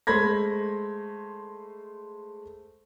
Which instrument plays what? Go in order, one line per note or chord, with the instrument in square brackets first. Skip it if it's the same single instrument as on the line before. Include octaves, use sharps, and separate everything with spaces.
[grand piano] G#3 A3 C5 B5 G#6 A#6